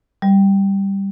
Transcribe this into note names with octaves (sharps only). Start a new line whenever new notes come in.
G3